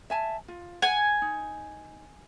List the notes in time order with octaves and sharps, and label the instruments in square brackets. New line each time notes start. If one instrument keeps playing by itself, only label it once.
[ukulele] E5 G#5 A5
F4
[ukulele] F#5 [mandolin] G#5
[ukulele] D#4